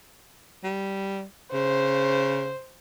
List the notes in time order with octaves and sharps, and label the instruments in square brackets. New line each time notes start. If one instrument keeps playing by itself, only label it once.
[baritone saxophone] G3
[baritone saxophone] C#3 [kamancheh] C5